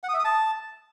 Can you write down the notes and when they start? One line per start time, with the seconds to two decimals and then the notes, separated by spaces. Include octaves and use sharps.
0.04 F#5
0.09 D#6
0.14 E5
0.19 D#6
0.25 A5